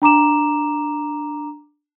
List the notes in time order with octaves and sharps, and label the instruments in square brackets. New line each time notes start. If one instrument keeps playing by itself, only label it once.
[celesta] D4 A#5 D6 E7